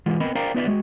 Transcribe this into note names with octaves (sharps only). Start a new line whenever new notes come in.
E2 E3 G#3 F4 F#5
B3 C4 A#4 D#5 B5
A#4 C5 D5 F5 G5 A#5
B3 D#4 F4 B4 D5 E5
G#3 F#4